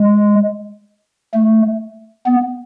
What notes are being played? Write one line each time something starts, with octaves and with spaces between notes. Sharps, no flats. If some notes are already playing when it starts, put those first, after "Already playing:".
Already playing: G#3
A3
B3